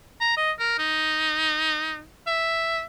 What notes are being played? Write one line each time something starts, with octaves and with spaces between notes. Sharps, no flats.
A#5
D#5
A#4
D#4
E5